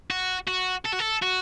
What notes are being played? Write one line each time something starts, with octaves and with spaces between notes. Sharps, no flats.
F#4
F#4
A4
F#4
A4
F#4